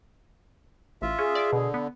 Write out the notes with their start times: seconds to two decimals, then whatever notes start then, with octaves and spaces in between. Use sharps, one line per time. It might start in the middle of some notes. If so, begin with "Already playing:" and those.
1.02 A1 F4 E5
1.19 C#4 G#4
1.35 D5
1.53 B2 D3
1.74 B3